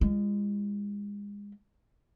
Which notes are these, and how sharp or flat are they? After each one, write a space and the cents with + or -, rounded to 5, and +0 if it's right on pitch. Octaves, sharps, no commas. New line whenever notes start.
G#3 -30 F4 -45